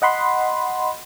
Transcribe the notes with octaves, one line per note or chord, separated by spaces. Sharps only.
D#5 F#5 B5 C6